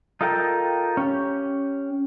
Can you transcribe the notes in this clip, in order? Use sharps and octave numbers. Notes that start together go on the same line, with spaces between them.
D#4 F4 A4 A#4 G5
C#4 G4